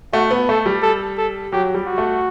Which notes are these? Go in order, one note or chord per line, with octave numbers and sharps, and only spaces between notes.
A3 F#4
B3
A3 A4
G3
A4
A4
F#3 G4
G3
F#4
A3